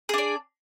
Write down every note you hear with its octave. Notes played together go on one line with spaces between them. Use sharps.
D4 G#4 D5